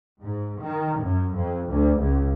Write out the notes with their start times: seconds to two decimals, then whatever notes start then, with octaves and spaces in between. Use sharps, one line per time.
0.21 G#2
0.60 D#3
0.99 F#2
1.34 F2
1.68 D2
2.00 C#2